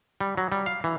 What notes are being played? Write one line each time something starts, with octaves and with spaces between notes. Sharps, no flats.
G3
F#3
G3
F5
E3